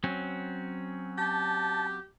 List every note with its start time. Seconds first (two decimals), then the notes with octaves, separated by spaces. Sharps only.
0.04 F#3 C4 C#4
1.18 G4 A5